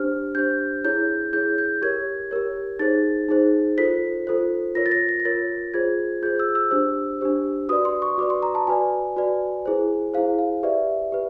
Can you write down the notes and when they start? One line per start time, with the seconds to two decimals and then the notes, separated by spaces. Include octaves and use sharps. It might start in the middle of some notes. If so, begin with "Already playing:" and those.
Already playing: D4 G4 C5 F6
0.35 D4 G4 C5 G6
0.84 E4 G#4 C#5 G6
1.33 E4 G#4 C#5 G6
1.58 G6
1.82 G4 A#4 C#5 G#6
2.31 G4 A#4 C#5
2.79 D#4 G#4 C5 A6
3.29 D#4 G#4 C5
3.78 F4 A4 C5 B6
4.27 F4 A4 C5
4.75 F4 A#4 C#5 A#6
4.86 A6
4.91 A#6
5.09 A#6
5.20 A#6
5.25 F4 A#4 C#5 A6
5.74 F4 G#4 C5 G#6
6.22 F4 G#4 C5 G6
6.39 E6
6.55 E6
6.71 D4 G4 C5 E6
7.21 D4 G4 C5
7.69 F#4 B4 D5 D#6
7.85 C6
8.02 C#6
8.18 F#4 B4 D5 D6
8.30 C6
8.43 A#5
8.55 A5
8.67 F#4 B4 D5 G#5
9.17 F#4 B4 D5
9.66 E4 G#4 C5
10.14 E4 G#4 C5 F5
10.39 F5
10.63 G4 B4 D5 E5
11.12 G4 B4